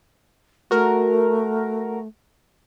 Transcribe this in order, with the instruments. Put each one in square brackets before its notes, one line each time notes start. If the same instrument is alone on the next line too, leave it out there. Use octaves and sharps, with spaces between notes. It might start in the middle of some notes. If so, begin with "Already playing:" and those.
[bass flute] A3 [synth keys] F#4 A#4